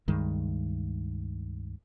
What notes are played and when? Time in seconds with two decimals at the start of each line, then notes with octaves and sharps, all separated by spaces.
0.08 C#2 G2 D#3 G#3